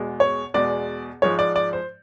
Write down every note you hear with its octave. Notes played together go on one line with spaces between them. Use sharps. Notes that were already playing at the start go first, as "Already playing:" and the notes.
Already playing: E2 B2 G#3
C#5
E2 B2 G#3 D5
G#2 F3 G#3 C#5
D5
D5
C5